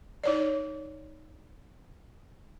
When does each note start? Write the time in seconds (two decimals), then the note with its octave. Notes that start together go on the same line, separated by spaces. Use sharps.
0.24 D#4 C#5 D5